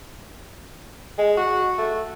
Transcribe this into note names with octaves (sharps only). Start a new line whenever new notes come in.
G#3
F#4
A3